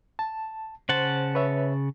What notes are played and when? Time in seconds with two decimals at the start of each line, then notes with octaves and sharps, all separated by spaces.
0.19 A5
0.89 C#3 C5 F#5 A5
1.35 B4 C#5 E5